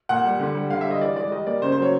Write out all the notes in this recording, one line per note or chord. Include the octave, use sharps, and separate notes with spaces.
A#2 F#5
G3
D3
G3
D3 F5
E5
G3 D#5
E3 D5
G#3 D5
G3 D#5
A#3 D5
C#3 C5
C5
F#3 C#5